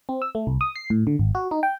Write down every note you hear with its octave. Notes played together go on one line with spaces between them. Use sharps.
C4
E6
A3
C2
D#6
C7
A2
D3
G#1
F#4
D#4
G5